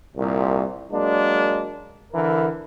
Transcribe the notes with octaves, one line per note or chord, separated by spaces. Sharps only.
C2 A#2
F#3 G#3 A#3 D4
D3 E3 A#4